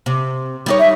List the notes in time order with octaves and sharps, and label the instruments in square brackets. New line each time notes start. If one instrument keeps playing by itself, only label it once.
[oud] C3
G3 D#4 C#5
[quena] E5